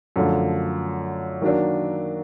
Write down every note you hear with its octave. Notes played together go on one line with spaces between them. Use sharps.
F#2 D3 F3 A3
D#3 F#3 A#3 D4